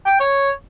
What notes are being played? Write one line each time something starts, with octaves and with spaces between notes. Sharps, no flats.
G5
C#5